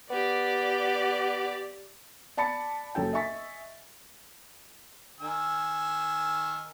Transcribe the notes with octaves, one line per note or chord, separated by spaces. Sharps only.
B3 G4 D5
D5 A5 B5 A6 C#7
F#1 C#4 A4 G5
D#5 E5 G#5 C#6 A6 B6
D#3 G#5 E6